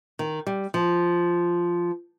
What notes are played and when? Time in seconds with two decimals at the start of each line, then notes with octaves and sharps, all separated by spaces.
0.19 D#3
0.47 G3
0.74 F3